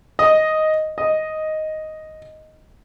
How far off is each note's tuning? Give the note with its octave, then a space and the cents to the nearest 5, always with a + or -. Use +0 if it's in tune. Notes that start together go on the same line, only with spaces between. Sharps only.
D#5 +5
D#5 +5